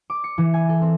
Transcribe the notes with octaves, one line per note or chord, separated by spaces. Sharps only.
D6
C#7
E3
G#5
A4
C4